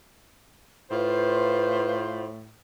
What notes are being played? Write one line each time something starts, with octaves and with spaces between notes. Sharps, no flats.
A2 F4 B4 C5